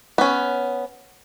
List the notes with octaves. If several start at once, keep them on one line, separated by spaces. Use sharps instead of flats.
B3 C#4